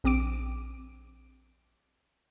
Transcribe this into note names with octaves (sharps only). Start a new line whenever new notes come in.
A#1 C4 D6 D7